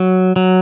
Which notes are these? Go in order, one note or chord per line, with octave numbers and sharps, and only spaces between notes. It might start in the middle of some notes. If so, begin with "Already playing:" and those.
Already playing: F#3
F#3